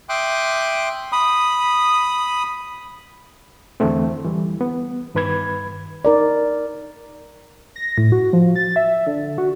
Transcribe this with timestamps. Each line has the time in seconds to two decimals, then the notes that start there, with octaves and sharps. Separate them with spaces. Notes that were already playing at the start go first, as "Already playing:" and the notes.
0.09 E5 G5 C6 D6 D#6 F#6
1.12 B5 D#6
3.80 E2 D3 E3 A3 C4
4.24 E3 G3
4.61 B3
5.15 G2 D#3 B4 B5 G#6
6.05 D#4 A#4 D5
7.76 A#6
7.98 A2
8.12 F#4
8.33 F3
8.56 A6
8.76 E5
9.07 D3
9.38 F#4